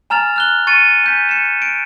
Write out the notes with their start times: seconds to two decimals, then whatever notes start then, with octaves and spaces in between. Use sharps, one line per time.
0.10 G#5 A#5 F6 A6 F7
0.36 F6 F#6 G7
0.67 C#6 A6 C#7 D#7
1.04 G#5 G6 B6
1.29 C#7 E7
1.62 D7